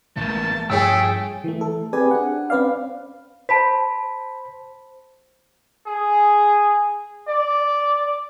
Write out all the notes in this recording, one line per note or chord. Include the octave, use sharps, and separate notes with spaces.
A1 A3 A#3 A5
G2 F3 A3 G#4 C#5 G5 E6
E3 A3
A4
C4 G4 G#4 B4 D5 G#5
D4 F#5
C4 C#4 B4 D5 F5
C5 A5 B5 B6
G#4
D5